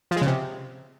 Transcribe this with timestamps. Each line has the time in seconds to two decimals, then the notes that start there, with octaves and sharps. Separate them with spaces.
0.11 F3
0.16 G#3
0.21 C#3
0.27 C3